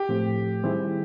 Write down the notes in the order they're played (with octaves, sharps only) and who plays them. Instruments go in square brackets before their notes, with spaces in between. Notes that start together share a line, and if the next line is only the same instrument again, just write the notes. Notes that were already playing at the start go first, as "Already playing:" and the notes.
Already playing: [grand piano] G4
[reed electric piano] A2 F3 A3 C4
D#3 G3 C4 E4 G#4